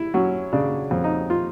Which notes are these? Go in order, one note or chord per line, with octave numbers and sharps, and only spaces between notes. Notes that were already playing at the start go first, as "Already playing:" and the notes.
Already playing: E4
F#3 C#4
C#3 D4
F2
D#4
F4